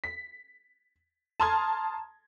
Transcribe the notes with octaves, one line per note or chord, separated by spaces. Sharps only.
B6
A5 A#5 C6 D#6 F6 G#6